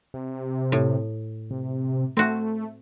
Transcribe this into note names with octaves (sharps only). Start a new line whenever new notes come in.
C3
A2
C3
A3 C4 F#4